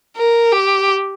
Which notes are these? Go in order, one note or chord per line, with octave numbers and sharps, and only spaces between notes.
A#4
G4